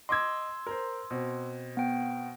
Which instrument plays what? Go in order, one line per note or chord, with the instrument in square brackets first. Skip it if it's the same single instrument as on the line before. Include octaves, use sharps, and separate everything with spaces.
[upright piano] D#5 D6 G#6 [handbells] C6 E6
[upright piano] A#4 C5
B2 C4
[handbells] B3 G5